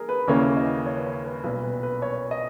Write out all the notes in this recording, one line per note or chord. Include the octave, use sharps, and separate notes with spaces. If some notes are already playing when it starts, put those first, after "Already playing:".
Already playing: A#3 G#4 A#4
B4
D#2 C#3 E3 A#3 C#5
D#5
C#5
B4
C#5
B4
B1 A#2 G3 B3 B4
B4
B4
C#5
D#5